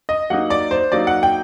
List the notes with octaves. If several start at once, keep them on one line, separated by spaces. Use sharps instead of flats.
D#5
F#3 A#3 D#4 F#5
D5
C5
F#3 A#3 D#4 D5
F#5
G5